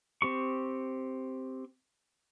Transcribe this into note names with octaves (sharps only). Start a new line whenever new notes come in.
C4 G4 C#6